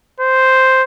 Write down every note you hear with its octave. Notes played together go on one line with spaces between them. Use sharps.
C5